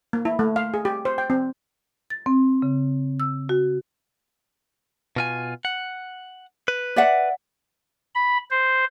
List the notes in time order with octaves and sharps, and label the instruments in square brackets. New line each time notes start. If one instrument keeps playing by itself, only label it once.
[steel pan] A#3
E4
A3
F5
G#4
G4
C5
G5
C4
[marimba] A6
C4
C#3
E6
F#4
[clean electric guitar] B2 F4 G#5
F#5
B4
[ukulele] D5 E5 F#5
[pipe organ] B5
C5